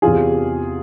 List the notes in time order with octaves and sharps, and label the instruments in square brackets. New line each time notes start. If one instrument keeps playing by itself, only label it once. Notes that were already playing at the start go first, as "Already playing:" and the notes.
[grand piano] E2 C3 E3 F4 G#4